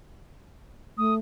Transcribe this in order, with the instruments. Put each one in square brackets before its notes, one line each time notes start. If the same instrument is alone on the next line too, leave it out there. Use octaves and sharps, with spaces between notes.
[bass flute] A3 [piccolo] D#6